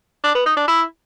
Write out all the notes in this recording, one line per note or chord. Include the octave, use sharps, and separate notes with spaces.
D4
B3
D#4
D4
E4